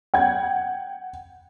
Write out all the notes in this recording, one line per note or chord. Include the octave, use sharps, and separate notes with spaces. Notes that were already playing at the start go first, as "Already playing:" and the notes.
F#5 G5 G#6